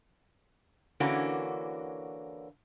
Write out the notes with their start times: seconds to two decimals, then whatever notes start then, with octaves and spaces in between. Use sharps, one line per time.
1.00 D3 E3 A#3 C#4 F#4